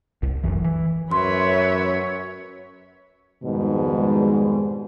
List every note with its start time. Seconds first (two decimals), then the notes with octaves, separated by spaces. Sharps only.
0.23 C2
0.43 D1 G#1 F#2 E3
0.64 E3
1.11 F#2 B4 C#5 E5 C6
3.44 F2 G#2 B2 D#3 G3 G#3